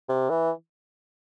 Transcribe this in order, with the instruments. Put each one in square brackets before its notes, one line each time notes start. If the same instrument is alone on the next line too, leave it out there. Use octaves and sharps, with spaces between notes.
[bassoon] C3
E3